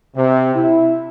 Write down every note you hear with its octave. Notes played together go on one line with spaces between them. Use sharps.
C3
E4